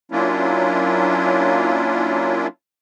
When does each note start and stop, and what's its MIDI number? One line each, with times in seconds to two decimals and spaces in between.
0.12 2.47 54
0.12 2.47 58
0.12 2.47 61
0.12 2.47 62
0.12 2.47 64
0.12 2.47 65